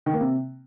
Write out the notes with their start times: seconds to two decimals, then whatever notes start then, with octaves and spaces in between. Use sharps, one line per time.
0.06 D#3
0.13 A#3
0.21 C3